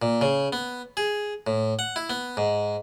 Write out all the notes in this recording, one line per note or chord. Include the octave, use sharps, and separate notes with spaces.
A#2
C#3
B3
G#4
A2
F#5
E4
B3
G#2